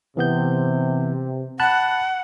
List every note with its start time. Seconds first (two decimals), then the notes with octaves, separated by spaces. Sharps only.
0.17 C3 E3 B3 G6
1.60 F#5 A5 B5 F#6